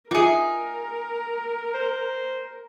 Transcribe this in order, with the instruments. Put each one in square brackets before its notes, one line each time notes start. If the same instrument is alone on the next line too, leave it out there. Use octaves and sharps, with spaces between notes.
[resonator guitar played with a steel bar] D#4 G#4 [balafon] F4 E5 [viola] A#4
[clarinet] C5